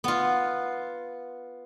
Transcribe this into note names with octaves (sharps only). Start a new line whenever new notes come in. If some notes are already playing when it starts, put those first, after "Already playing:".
B3 F4